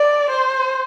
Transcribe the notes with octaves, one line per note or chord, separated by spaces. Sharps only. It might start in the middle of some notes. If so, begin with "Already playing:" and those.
Already playing: D5
C5